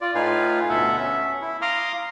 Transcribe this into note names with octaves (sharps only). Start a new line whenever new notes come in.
F4 D5
A2 D#4 F4 B4 F5 G#5
D2 B2 B3 A4 E5 F#5
C#4 E5
E4
F5 A#5 C6 D6 D#6 F6